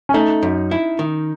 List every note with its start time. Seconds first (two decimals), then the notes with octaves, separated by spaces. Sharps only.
0.09 C#4
0.14 A3 D#4
0.43 F#2
0.71 E4
0.99 D#3